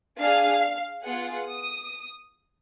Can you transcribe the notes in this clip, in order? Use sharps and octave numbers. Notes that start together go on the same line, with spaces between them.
D4 G#4 F5
B3 F4 G#4 F#5
D#6